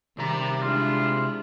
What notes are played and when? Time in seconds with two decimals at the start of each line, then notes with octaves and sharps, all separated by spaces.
0.18 C3 D#3 G3 D5 A#5
0.62 G#3 D4 E4 F4